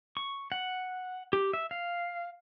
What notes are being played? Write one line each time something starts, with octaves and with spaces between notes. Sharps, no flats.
C#6
F#5
G4
E5
F5